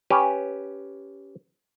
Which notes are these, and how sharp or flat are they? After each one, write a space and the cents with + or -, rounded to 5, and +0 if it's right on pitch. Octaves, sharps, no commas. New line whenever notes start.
C#4 +0 G4 +0 B4 +0